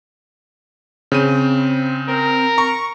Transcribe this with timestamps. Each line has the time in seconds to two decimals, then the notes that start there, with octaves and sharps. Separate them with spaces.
1.12 C#3 C4 D#7
2.08 C4 A#4
2.58 A#5 C#6